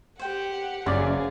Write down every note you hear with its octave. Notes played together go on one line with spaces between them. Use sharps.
G4 C5 F#5 G5
F#1 F#2 G#4 D5 F5